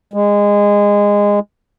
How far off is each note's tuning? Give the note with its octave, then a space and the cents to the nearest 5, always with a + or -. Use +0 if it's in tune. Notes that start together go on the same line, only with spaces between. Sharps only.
G#3 -20